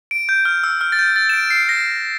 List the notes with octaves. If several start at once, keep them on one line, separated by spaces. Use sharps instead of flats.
D7
G6
F6
E6
F6
A6
G6
A6
E7
D7
C7
A#6